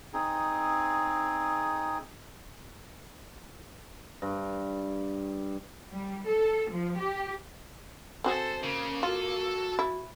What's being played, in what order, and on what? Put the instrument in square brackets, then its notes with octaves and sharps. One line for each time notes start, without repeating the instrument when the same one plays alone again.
[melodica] C4 D#4 G#4
[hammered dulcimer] G2
[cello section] G3
A4
F3
G4
[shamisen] C4 F#4 G#4 [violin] A4 C5
[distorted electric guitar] C#3 [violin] A#3
[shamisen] F4 [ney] F#4 [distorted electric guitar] A4
[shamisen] E4